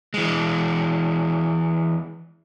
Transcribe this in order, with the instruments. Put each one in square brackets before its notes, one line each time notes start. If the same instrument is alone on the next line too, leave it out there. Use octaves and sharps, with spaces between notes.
[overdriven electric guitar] E3 G#3